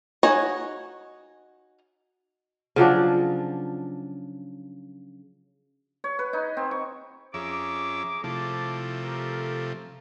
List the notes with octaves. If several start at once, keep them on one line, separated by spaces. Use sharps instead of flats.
D#4 F#4 C#5 D#5 G#5
C#3 F3 F#3 D4
C#5
B4
D#4
C4
C#6
F2 C#4 G#4 E5 A#5 D6
C3 F3 A3 E4 A5 D6
G4 A4 A#4